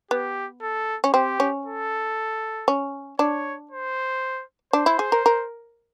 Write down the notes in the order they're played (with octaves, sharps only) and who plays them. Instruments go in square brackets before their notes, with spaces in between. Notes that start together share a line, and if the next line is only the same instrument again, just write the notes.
[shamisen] B3 [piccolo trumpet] G4
[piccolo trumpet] A4
[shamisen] C#4
[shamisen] C4 [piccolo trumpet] G4
[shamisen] C#4
[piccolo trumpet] A4
[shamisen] C#4
[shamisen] D4 [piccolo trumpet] C#5
[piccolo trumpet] C5
[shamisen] D4 [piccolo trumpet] C5
[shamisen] E4
G#4
A#4
A#4